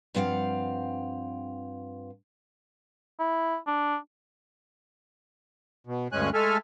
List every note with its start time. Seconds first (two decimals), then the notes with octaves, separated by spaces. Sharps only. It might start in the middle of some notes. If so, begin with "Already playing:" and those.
0.15 G2 F3 C4 F5 F#5
3.19 E4
3.67 D4
5.87 B2
6.12 D2 G2 G#3 C#4 G#5 F#6
6.34 G#3 A3 A4 E5 G#5 F6